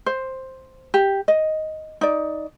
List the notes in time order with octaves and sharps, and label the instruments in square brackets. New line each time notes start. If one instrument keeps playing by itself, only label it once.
[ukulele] C5
G4
D#5
D#4 D5